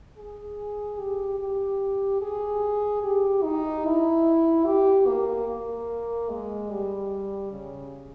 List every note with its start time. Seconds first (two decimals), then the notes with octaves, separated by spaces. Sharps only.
0.18 G#4
0.99 G4
1.39 G4
2.22 G#4
3.03 G4
3.43 D#4
3.85 E4
4.65 G4
5.07 A#3
5.48 A#3
6.29 G#3
6.70 G3
7.52 C#3